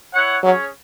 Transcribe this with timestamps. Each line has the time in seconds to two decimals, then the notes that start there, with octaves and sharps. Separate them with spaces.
0.14 E4 C#5 F#5
0.43 F#3 C#4 G#4 C#5